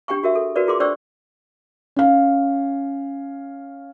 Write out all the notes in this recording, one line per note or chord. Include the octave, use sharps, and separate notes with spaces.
D4 G4 G5 G#5 C#6
F#4 A#4 E5
A4
F#4 A#4 B4 D5
F4 G#4 A#4 C6 D6
D4 C5 D5 G5 C#6 E6
C#4 F5